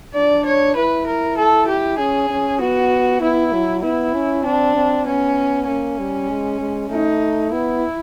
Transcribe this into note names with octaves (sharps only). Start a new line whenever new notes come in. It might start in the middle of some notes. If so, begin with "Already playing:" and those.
D4 D5
C#5
E4 B4
A#4
A4
G4
C#4 G#4
C#4
B3 F#4
B3 E4
F#3
B3 E4
C#4
C4 D4
C4
B3 C#4
A#3 C#4
G3
G#3
G#3
A3 D#4
B3 E4